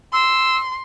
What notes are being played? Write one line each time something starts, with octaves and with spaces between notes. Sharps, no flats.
C6 E6